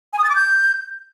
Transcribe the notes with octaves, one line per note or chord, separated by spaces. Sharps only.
G#5
D#6
A6
D6
G6